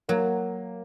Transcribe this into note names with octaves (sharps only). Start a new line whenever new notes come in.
F#3 A#3